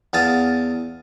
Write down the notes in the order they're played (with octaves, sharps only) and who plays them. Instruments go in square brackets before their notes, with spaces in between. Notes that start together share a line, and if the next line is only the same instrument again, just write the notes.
[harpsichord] E2 F5 A5 D#6